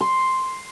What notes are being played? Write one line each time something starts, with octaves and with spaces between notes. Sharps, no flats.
C6